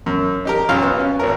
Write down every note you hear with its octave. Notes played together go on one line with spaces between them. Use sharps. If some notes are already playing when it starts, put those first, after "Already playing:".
F#2
D#4 G4 A#4
B1 C#4 F4 F5
B3
C#4
G#1 B3 A#4